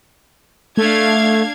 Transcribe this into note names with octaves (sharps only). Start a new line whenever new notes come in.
A3 D4 F5 G#6